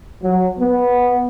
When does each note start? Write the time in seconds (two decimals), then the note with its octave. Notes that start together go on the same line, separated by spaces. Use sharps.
0.23 F#3
0.59 B3